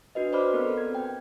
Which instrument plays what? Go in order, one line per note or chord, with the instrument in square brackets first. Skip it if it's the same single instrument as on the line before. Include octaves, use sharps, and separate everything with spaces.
[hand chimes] D4 F#4 B4 D#5
B4 C5 D5 B5 D6 F6
B3 C4 A4 A#4
G#6
G5